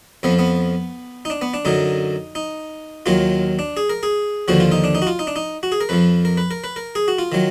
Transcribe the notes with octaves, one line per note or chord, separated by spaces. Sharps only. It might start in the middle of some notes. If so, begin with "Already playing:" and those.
F2 F3 B3
B3
D#4
D4
B3
D4
F#2 D3 F#3 D#4
D#4
D#2 D#3 F#3 F4
D4
G#4
A#4
G#4
D#2 D3 F3 F#4
F4
D#4
D4
D#4
F#4
F4
D#4
D4
D#4
F#4
G#4
A#4
F2 F3 B4
A#4
B4
A#4
B4
A#4
G#4
F#4
F4
D#3 F#3